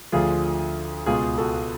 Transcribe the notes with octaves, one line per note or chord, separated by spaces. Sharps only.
D2 D3 F3 F4 G#4
C#2 B2 F4 G#4
F#4 A4